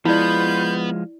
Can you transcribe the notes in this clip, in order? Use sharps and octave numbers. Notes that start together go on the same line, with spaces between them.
F3 G#3 B3 E4 F4 D5 B5 G6